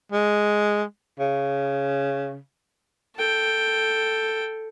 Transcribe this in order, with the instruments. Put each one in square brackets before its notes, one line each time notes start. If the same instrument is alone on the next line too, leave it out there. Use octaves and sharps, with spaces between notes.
[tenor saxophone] G#3
C#3
[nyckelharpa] A4 G5